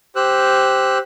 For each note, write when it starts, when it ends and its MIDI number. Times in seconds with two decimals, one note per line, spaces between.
0.16 0.98 67
0.16 0.98 72
0.16 0.98 88
0.16 0.98 90